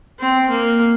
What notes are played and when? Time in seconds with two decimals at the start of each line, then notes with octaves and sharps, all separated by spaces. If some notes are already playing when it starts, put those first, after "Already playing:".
0.20 C4
0.49 A#3